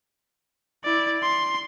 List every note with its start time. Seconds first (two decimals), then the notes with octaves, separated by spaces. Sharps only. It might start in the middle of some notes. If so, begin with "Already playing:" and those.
0.84 E4 D5
1.22 C6